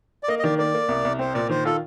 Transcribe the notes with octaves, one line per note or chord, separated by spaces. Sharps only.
D5
A#3 D#5
D#5
D#3 D5
A#3 D5
A#3
C2
C2
C4 C5
A#2 D5
D#3 C5
F4 A4